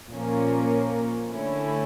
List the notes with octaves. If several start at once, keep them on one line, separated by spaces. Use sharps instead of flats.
A#2 F3 A#3 C#4
D3 A3 C#4 E4